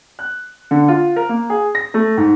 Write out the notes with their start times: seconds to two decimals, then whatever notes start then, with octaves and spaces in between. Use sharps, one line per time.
0.19 F#6
0.71 D3
0.88 F4
1.16 A#4
1.29 A#3
1.50 G#4
1.75 A#6
1.94 A3
2.18 G#2